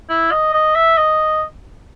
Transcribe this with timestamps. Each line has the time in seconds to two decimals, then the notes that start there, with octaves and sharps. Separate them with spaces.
0.10 E4
0.31 D#5
0.53 D#5
0.76 E5
0.98 D#5